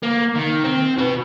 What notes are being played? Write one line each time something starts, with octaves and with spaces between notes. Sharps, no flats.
A#3
D#3
C4
F#4 B4